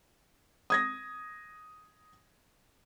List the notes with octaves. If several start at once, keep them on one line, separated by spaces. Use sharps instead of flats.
D#6 G#6 A#6